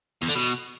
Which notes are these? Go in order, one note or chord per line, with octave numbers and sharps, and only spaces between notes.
E2
D3
B2